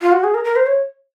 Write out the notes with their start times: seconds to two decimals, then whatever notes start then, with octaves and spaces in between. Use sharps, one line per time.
0.02 F4
0.12 F#4
0.24 G#4
0.34 A#4
0.44 A#4
0.56 C5
0.66 C#5